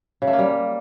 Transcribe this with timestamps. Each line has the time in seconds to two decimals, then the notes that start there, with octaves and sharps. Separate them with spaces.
0.22 C#3
0.27 A3
0.33 A#3
0.39 G3